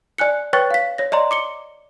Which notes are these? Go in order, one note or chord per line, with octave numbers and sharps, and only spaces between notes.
D5 G#5 F#6 C#7
B4 C#5 G5 C#6 F#6 A6
F5 B6
C#5 A#6
D5 D#5 A#5 C6
D6 C#7 G7